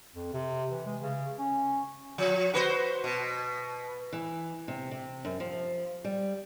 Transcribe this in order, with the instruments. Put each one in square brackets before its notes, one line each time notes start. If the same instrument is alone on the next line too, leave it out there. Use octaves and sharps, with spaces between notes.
[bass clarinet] F2
C3
E3
G#3
C#3
C#4
[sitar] F3
F#4 B4 C5
B2
[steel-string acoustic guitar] E3
C3
C3
F#2
F3
G3